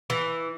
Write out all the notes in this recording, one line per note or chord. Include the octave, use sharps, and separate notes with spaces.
E3